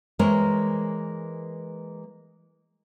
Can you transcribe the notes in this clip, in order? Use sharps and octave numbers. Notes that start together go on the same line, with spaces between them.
E3 G#3 A#3 A#4 C5 C#5